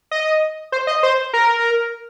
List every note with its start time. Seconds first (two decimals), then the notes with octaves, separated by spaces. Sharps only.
0.11 D#5
0.72 C5
0.87 D#5
1.03 C5
1.33 A#4